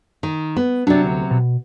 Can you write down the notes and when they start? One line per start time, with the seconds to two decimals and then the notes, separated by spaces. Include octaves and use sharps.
0.23 D#3
0.56 B3
0.87 C3 F#3 D4 D5
1.04 D2
1.31 B2